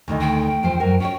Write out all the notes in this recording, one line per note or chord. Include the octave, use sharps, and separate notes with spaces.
D2 D#3 D#5
G5
E2 F3 C5
F#2 F#4 A#4
C#4 C#5 G5